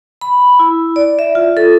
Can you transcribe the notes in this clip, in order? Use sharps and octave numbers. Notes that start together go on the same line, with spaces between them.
B5
E4
D5
E5
F4
A4